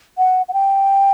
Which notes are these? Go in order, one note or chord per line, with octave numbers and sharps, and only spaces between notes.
F#5
F#5
G5